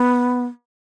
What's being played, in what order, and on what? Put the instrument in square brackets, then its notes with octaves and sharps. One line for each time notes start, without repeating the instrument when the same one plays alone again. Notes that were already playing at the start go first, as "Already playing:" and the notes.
Already playing: [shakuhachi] B3